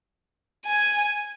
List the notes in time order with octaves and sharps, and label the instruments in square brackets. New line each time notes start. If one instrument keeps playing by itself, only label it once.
[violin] G#5